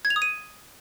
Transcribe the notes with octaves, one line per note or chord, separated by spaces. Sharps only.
G#6
F7
D#6
D#7